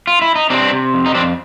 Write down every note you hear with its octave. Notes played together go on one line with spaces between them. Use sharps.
F4
E4
D#4
C3 C4 D4
C3
F2
D#4
F2 C4 D4